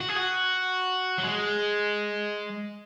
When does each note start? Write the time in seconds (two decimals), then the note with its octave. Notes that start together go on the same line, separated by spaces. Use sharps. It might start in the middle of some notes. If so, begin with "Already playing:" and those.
0.01 F#4
0.09 G#4
0.16 F#4
1.18 F#3
1.24 G#3